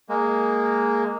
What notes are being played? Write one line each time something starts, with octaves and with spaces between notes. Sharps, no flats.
G#3 A#3